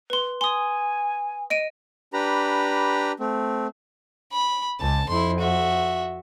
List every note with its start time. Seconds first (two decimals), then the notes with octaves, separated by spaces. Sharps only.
0.10 B4 C6
0.41 G#5 C6 D#6
1.50 D#5 D7 D#7
2.13 D4 G4 B4 A#5 B5
3.19 A3 C4
4.32 B5
4.80 C#2 A5
5.09 F2 E4 C6
5.39 F#4 E5